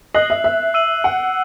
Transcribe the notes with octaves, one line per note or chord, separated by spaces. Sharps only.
D#5 F#6 C7 F#7
E5
E5
E6 C7 D#7 F#7
F#5